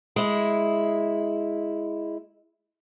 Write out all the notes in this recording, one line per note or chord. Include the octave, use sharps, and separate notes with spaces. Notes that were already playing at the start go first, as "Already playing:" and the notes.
G#3 E4